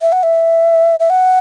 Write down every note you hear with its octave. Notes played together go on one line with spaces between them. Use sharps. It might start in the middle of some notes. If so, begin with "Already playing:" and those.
E5
F#5
E5
E5
F#5